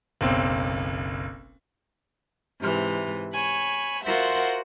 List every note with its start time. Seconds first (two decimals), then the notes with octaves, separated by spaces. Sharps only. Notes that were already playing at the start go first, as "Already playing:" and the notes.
0.21 F#1 B1 C4
2.59 G#2 C3 E3
3.32 C#5 G#5 B5
4.04 F4 F#4 A#4 C5 E5 F#5